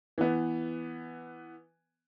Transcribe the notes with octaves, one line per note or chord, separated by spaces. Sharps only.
E3 B3